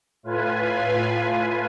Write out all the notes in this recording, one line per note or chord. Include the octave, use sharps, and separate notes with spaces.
A2 F4 B4 G#5